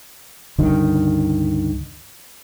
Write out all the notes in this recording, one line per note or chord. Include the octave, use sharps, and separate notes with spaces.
C#2 G2 D3 D#3